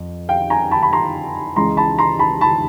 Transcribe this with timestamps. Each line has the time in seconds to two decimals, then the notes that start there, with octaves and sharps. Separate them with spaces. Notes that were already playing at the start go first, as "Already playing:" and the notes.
Already playing: F2
0.29 F5 G5
0.50 G#5 A#5
0.71 A5 B5
0.83 B5
0.93 A#5 C6
1.56 C#2 C#3 E3 G#3 A#5 C6
1.77 A5 B5
1.99 A#5 C6
2.19 A5 B5
2.41 A5 B5